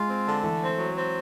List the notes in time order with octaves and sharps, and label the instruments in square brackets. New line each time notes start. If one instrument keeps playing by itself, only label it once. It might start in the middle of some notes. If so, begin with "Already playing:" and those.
Already playing: [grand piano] G#3 [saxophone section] F4
[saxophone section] C4
D3
[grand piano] E3 [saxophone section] A3
[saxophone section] C4
F#3
C4